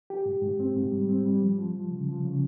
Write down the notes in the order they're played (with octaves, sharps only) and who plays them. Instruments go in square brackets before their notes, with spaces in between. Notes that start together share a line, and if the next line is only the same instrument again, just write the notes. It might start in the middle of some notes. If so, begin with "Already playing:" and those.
[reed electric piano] G4
G#2
G#2
C4
G#2
G3
C4
G3
F3
F3
F3
C#3
F3
C#3